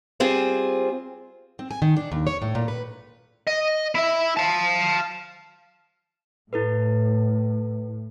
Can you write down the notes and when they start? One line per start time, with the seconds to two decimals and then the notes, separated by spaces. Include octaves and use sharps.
0.20 G3 C4 F4 G#4 C5
1.59 C4
1.71 G#5
1.82 D#3
1.96 D4
2.12 D#2
2.27 C#5
2.42 A2
2.55 A#2
2.68 B4
3.47 D#5
3.95 E4 E5
4.37 F5 A5
6.53 A2 E4 A4 B4